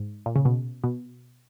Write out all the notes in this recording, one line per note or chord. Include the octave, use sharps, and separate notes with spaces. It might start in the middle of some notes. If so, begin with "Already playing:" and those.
Already playing: G#2
A#2
C#3
B2
B2